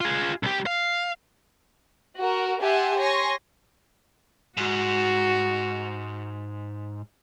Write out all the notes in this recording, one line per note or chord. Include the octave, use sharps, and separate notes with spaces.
F4 G#4
C2 G4
F5
F#4 A#4
G4 E5 F#5 G#5 A5 C6
C#5 G#5 C6 C#6 A#6
G#2 F#4